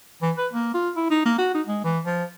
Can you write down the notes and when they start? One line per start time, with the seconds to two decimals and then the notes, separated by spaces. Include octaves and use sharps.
0.22 E3
0.38 B4
0.52 A#3
0.74 F4
0.96 E4
1.10 D#4
1.25 A#3
1.38 F#4
1.54 D#4
1.67 G#3
1.84 E3
2.05 F3